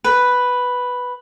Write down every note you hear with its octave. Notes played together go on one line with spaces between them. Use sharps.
B4